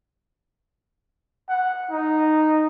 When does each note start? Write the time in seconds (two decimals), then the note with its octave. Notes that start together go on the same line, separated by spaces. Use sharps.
1.49 F#5
1.91 D#4